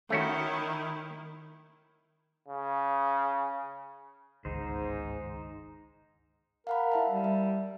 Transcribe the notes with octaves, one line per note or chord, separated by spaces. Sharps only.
D#3 A3 C#4 E4 F#4
C#3
G1 C#2 G#2 D#3 D#4 C5
A#4 F5 F#5 B5
E4 E5 A5
G3
E5